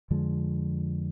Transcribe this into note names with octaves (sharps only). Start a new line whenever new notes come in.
F2 D3 F3 G#3